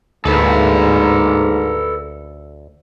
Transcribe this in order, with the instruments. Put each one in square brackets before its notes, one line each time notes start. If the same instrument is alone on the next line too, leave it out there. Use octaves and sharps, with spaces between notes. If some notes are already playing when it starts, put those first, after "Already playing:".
[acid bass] D2 [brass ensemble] G#2 A#3 [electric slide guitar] A4 B4